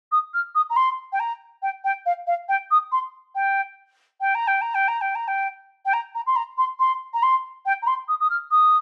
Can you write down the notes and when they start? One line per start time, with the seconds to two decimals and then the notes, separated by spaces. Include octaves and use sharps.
0.12 D#6
0.34 F6
0.55 D#6
0.70 A#5
0.76 C6
1.12 G5
1.20 A#5
1.62 G5
1.84 G5
2.06 F5
2.27 F5
2.49 G5
2.71 D#6
2.92 C6
3.35 G5
4.21 G5
4.35 A#5
4.47 G5
4.61 A#5
4.75 G5
4.88 A#5
5.01 G5
5.15 A#5
5.28 G5
5.85 G5
5.93 A#5
6.15 A#5
6.27 C6
6.36 A#5
6.58 C6
6.79 C6
7.14 A#5
7.23 C6
7.66 G5
7.82 A#5
7.87 C6
8.08 D#6
8.20 D#6
8.30 F6
8.51 D#6